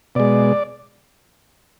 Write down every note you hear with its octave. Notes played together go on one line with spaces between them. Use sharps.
B2 G#3 D5